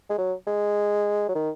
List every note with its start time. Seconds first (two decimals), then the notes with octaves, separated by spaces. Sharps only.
0.10 G#3
0.18 F#3
0.47 G#3
1.29 F#3
1.35 D#3